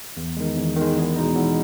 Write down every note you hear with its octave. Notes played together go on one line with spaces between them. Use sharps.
E2
D#3 G#3
E2
D#3 G#3
E2
B2 G#3 D#4
E2